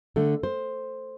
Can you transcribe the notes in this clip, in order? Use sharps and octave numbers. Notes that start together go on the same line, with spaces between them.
D3 A3
C5